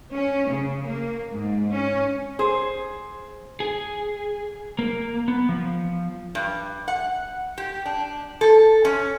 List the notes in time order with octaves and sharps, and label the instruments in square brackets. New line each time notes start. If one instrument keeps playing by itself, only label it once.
[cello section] C#4
C#3
A#3
G#2
C#4
[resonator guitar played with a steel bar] G#4 C5
[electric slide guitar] G#4
A#3
B3
F3
[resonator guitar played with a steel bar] G2
F#5
G4
D4
A4
C#4